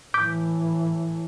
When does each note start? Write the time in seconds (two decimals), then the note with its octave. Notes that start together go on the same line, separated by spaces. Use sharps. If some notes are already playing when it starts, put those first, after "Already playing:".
0.14 A2 E3 D6 G6 B6